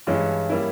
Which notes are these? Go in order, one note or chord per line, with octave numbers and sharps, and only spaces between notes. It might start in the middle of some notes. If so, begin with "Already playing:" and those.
G2 E3 G#3 C#4 E4
G3 A#3 C#4 E4